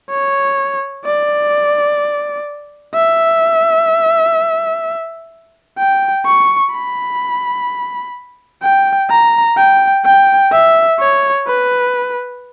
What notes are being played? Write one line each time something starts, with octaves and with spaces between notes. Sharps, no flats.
C#5
D5
E5
G5
C#6
B5
G5
A#5
G5
G5
E5
C#5
B4